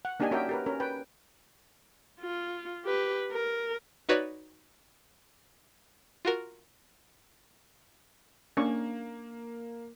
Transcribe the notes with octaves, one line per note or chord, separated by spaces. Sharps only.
F#5
A#3 D4 D#4 G4 D#5 G#5
C#4 F#4 A#4 D5 E5 G5
G4 A#4 B4
C#4 A#4
B4 G5
F4
G4 B4
A#4
D#4 F#4 B4 C#5 D5
F4 F#4 A#4
A#3 C#4 D4 C#6